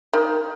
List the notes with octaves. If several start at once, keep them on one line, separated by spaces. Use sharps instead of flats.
D#3